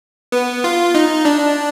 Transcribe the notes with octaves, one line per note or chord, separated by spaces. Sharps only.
B3
F4
D#4
D4